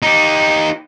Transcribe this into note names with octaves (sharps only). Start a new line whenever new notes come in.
D#4 G4